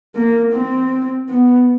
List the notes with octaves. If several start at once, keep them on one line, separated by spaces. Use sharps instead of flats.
A#3
C4
B3